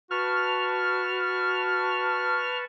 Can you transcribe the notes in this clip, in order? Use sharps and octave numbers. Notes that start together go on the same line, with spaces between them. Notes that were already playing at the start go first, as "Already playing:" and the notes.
F#4 B4 A5 C#6 F6